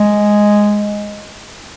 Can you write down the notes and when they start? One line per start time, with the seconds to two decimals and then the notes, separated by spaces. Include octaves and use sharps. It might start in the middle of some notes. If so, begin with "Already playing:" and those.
Already playing: G#3